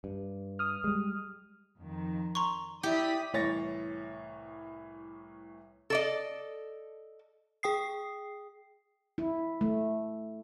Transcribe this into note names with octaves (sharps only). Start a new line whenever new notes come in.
G2
D#6 F6
G3 G#3
F2 D#3
A#5 C6 C#6
E4 G4 D5 D#6 B6
C2 A2 E3 C#5 A6 A#6
A4 D5 D#5
G#4 G5 D#6 C7
E4
A3